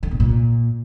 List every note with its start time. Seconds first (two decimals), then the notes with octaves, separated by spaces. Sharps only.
0.03 D3
0.11 B2
0.20 A#2